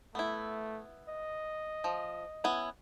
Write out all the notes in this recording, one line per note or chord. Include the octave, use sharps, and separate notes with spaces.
A3 B3 E4
D#5
F3
B3 C#4 E4